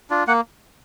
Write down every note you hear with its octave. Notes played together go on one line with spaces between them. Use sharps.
D4 F4
A#3 F#5